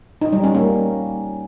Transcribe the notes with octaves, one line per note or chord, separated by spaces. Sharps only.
D#4
G3
C#4
A#3